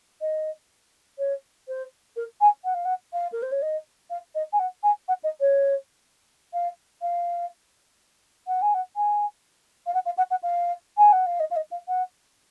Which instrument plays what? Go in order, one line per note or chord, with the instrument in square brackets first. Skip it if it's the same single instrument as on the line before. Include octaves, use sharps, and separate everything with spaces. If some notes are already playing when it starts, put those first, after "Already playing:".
[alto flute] D#5
C#5
C5
A#4
G#5
F#5
F5
F#5
F5
A#4
C5
C#5
D#5
F5
D#5
G#5
F#5
G#5
F#5
D#5
C#5
F5
F5
F#5
G#5
F#5
G#5
F5
F#5
F5
F#5
F#5
F5
G#5
F#5
F5
D#5
F5
D#5
F5
F#5